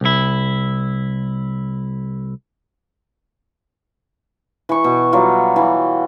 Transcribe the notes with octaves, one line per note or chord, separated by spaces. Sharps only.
C2 E4
E3 C#6
B2
F#3 G3 F4
E3 F4